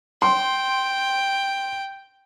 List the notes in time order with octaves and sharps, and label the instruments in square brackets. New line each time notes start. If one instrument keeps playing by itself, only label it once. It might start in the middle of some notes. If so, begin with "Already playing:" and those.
[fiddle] G5 [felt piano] C6